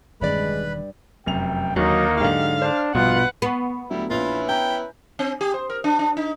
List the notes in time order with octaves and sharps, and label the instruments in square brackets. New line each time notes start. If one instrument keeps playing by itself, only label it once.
[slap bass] E1 D#3 C#4 [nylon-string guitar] G2 D5 [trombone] G#3 [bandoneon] B4 B5
[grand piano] F1 F#2 F7 [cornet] G5
[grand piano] D#2 D3 [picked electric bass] F#3 [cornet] A#3 [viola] D#4
[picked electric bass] G#2 D3 [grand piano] F#3 D#4 G4 [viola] F5
[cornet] D4 [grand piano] C5 F6
[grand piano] A#1 G2 [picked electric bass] B2 [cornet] F4 [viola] B4 F#5
[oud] B3 [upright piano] C#6 C7
[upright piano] D2 F#3 [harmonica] G3 E4
[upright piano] A#1 F7 [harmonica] C#4 E4 B4 [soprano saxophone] F4
[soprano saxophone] G5 [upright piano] G#5 A#5 G6
[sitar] C4
G4
C5
A#4
D4
D4
D#4